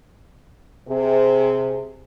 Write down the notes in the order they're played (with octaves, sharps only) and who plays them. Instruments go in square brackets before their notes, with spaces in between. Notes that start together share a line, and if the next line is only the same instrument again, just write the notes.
[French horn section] C3 G#4